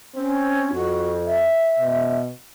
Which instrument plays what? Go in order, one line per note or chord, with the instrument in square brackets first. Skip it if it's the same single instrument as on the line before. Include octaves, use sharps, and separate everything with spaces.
[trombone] C4 [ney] C#4
[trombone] F2 [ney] F#4
[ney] E5
[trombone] B2